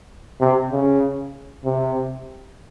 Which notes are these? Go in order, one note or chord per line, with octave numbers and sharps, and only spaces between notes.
C3
C#3
C3